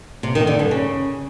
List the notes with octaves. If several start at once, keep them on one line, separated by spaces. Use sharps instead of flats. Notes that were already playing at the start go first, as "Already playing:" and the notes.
C3
D#3
D3
G2
C#3